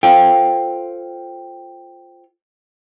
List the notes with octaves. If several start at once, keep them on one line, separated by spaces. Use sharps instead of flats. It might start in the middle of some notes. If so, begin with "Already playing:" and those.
F4 A4 C5 F5 G5